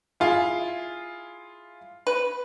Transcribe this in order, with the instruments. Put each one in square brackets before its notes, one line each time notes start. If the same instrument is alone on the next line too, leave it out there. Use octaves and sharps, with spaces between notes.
[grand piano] E4 F4 G#4
[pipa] B4